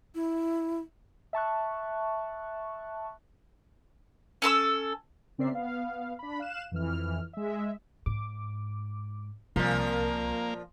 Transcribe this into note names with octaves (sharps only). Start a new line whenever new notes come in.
E4
E5 A5 C#6 F#6
C#4 A4 C6 E6
C#3 C4 A#4 D5 E5 C7
B3 F5
D4 B5
F5 F#6 E7
F2 E3 F6
G#3 E5
G#2 D6
C2 A#2 F3 A#3 C4 A#4